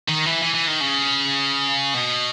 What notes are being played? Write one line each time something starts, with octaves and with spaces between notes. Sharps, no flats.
D#3
E3
E3
E3
D#3
C#3
B2